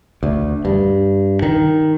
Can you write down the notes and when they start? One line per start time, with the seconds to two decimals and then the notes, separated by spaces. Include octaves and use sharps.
0.23 D2
0.65 G2
1.42 D#3